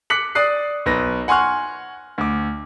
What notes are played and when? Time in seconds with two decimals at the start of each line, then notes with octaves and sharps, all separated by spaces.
0.10 D6 F#6 B6 C#7 F#7
0.35 D5 D#6 F#6 C7
0.86 B1 B4 A#6
1.28 F#5 G#5 C6 C#6 F6 F#6
2.18 D2 D6